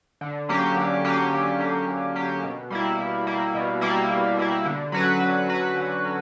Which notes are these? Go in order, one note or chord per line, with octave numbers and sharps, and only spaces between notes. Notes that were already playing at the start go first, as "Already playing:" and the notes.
D3
F#3 A#3 C#4 G4
D3
F#3 A#3 C#4 G4
D3
F#3 A#3 C#4 G4
D3
F#3 A#3 C#4 G4
B2
G3 A#3 E4
B2
G3 A#3 E4
B2
G3 A#3 E4
B2
G3 A#3 E4
D3
F#3 C#4 F#4 B4
D3
F#3 C#4 F#4 B4
D3
F#3 C#4